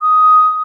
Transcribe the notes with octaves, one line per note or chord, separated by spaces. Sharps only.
D#6